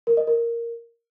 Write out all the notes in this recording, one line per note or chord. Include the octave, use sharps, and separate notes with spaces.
A#4
D#5
A#4